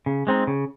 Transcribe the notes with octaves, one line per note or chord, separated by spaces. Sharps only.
C#3
G#3 C4 D#4
C#3